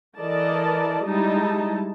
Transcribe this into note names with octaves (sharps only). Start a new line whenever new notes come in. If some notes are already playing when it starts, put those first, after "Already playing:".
E3 A4 A#4 D5 D#5 A5
G3 G#3 D#4 E4 A5